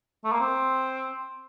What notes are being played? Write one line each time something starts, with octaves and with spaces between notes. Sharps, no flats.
A3
A#3
C4